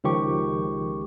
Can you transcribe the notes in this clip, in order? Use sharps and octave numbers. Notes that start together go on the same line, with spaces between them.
C#2 D#3 F3 G4 C#6